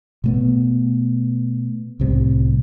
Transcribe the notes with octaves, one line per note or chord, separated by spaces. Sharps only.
B2 A3 B3
C2 A2 C3 G3